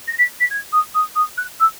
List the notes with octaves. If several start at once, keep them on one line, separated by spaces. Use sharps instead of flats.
A#6
B6
B6
G#6
D#6
D#6
D#6
F#6
E6